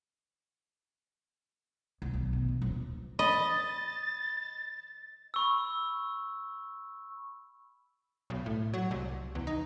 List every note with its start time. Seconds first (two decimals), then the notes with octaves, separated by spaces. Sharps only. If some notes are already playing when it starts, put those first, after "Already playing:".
2.02 C2
2.14 B1
2.33 B2
2.48 E2
2.62 D#1
3.19 D#5 B5 A6
5.34 B5 C#6 E6
8.30 B1
8.46 A2
8.74 F#3
8.91 C2
9.35 E2
9.47 D#4